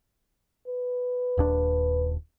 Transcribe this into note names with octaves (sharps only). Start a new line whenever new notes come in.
B4
D#1 D#2 D4